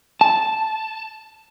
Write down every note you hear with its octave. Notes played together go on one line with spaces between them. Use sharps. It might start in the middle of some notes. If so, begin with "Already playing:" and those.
A5